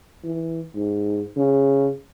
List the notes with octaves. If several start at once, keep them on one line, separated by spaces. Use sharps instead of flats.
E3
G#2
C#3